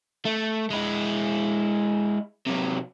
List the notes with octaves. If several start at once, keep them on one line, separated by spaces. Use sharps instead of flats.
A3
G#3 E4
C3 F#3